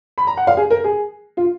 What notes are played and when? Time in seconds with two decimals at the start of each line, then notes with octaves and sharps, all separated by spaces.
0.18 B5
0.27 A#5
0.37 F#5
0.47 F5
0.57 G#4
0.70 A#4
0.84 G#4
1.37 F4